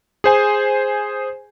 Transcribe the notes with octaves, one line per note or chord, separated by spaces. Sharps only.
G#4 C5 G#5